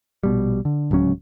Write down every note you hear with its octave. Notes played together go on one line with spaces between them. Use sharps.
A#1 B2 G3
D3
D1 C#2 F#3 C#4